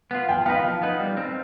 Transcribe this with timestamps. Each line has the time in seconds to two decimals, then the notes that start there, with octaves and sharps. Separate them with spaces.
0.11 B3 F4
0.29 F3 G5
0.46 B3 D#4 B4 F5
0.64 F3
0.82 B3 D#4 B4
1.00 G3
1.17 C4 D#4